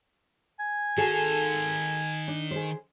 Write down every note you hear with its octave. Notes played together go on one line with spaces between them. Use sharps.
G#5
D#3 F#4 G#4 A4 A5
D4
G#4 C5